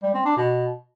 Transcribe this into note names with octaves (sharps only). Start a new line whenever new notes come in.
G3
C4
D4
B2